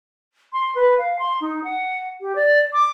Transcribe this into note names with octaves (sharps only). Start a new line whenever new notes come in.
C6
B4
F5
C6
D#4
F#5
G4
D5
D6